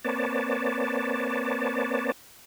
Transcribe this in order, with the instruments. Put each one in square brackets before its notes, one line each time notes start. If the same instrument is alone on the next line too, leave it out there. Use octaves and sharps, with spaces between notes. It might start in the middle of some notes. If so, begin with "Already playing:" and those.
[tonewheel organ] A#3 C4 B4 C#5 D5 A5